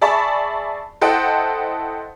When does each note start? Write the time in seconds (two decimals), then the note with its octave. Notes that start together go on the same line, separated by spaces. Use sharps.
0.01 G#4 D5 E5 A5 B5 C#6
1.01 E4 A4 C5 D#5 F#5 G5